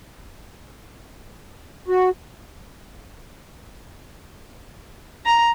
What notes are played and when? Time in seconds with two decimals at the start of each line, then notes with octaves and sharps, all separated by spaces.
1.88 F#4
5.26 A#5